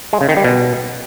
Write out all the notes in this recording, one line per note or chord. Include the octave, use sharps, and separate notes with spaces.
G#3
C#3
D#3
G3
B2